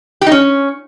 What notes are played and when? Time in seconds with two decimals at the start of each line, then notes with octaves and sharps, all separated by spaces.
0.21 G4
0.27 D#4
0.32 C#4